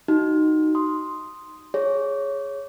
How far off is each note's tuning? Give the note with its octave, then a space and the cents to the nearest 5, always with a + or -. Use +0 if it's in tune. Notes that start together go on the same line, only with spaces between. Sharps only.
D#4 +0 F#4 +25
C6 +0 D#6 +0
G#4 +0 C#5 +0